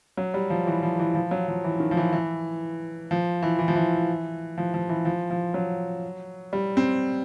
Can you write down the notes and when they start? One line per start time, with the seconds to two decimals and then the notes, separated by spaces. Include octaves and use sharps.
0.17 F#3
0.34 G3
0.50 F3
0.67 E3
0.83 F3
0.99 E3
1.15 F3
1.31 F#3
1.48 F3
1.64 E3
1.80 D#3
1.91 F3
1.97 E3
2.13 E3
3.11 F3
3.42 E3
3.59 E3
3.68 F3
3.76 E3
4.58 F3
4.74 F3
4.89 E3
5.05 F3
5.30 F3
5.54 F#3
6.53 G3
6.77 C4